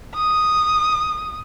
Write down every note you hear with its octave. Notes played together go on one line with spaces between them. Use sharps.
D#6